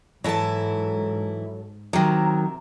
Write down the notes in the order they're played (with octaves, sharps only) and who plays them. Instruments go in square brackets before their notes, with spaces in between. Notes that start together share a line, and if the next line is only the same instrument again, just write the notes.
[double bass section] G#2 [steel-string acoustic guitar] E3 E4 [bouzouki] F#3 A4 A5
[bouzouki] C3 A#4 E5 [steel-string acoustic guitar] D#3 F#3